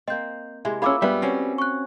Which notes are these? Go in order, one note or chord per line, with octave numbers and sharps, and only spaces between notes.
A#3 C4 D#5 G6
C3 G#3 E4
A#3 C#4 E4 F4 G#4 B5 D6 E6
G2 G3 G#3 B3 E5
C4 C#4 F#4
C#6 F#6